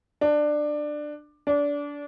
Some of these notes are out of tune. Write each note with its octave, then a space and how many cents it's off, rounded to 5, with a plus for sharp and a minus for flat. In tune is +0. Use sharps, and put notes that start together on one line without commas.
D4 +15
D4 -25